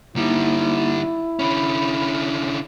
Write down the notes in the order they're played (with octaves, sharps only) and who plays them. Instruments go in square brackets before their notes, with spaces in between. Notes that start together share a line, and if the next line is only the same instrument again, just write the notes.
[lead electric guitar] D3 G3 [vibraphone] A#3 D#4 [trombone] E4
[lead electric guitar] D3 C#4 [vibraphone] B5